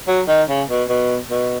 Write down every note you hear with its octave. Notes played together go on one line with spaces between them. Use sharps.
F#3
D#3
C#3
B2
B2
B2